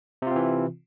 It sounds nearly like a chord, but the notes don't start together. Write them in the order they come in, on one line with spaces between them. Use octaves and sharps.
C3 F4 C4 E3